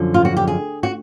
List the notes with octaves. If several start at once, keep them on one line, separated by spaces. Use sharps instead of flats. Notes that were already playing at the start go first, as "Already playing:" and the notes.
Already playing: F#2 D3 F3
F4
F#4
G4
G#4
F#4